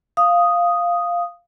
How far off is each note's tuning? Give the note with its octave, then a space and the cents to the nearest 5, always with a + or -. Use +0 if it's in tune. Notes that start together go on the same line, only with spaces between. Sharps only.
F5 +0 D#6 +0